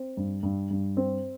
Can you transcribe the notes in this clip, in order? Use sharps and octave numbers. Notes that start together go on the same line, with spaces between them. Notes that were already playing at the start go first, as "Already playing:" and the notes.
Already playing: C4
G2
G2
G2
C4